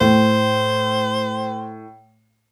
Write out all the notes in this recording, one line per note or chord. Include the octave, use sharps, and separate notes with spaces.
A2 C5